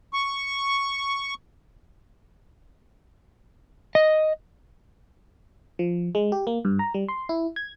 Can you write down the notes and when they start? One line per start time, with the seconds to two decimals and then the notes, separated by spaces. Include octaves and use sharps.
0.13 C#6
3.95 D#5
5.79 F3
6.15 G#3
6.32 G4
6.47 A#3
6.65 G2
6.79 A#5
6.94 G3
7.08 C6
7.29 E4
7.56 G#6